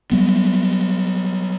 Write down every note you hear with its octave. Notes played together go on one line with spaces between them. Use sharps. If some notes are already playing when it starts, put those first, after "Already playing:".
F#3 G3 B3